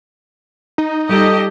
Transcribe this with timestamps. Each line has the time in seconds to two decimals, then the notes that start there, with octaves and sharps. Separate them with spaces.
0.78 D#4
1.09 G3 F4 G4 A4 D#5